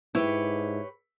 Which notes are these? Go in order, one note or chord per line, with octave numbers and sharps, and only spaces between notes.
G#2 E4 G4 B4 C#5